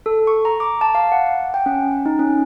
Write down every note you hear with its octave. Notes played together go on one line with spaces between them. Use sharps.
A4
C#6
A#5
D6
A5
F5
F#5
G5
C#4
D#4
C#4